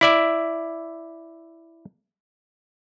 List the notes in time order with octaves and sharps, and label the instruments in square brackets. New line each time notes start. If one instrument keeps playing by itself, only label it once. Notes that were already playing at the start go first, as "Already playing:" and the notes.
[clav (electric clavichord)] E4 D5 E5